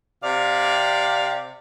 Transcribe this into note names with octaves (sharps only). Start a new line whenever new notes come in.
C3 D5 F5